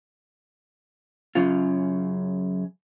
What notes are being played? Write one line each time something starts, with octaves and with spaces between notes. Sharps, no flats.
F#2 C#3 F4